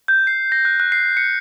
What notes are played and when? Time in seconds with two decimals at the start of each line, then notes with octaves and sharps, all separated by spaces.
0.08 G6
0.27 C7
0.52 A#6
0.65 F#6
0.80 F#6
0.92 C7
1.17 C#7